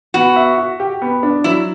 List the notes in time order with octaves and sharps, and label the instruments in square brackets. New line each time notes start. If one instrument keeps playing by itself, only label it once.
[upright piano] B3 [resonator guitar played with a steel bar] F#4
[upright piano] E5
F#4
G4
B3
D4
[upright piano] F#3 [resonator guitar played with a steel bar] E4